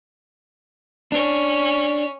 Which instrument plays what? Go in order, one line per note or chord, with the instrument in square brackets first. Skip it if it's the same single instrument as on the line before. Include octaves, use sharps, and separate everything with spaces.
[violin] C#4 F7 [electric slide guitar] D4